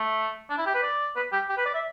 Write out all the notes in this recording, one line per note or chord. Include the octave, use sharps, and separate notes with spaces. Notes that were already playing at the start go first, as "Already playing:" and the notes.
Already playing: A3
D4
E4
G4
B4
D5
B4
G4
G4
B4
D5
E5